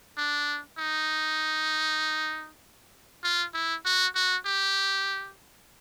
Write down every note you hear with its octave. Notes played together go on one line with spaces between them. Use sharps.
D4
D#4
F4
E4
F#4
F#4
G4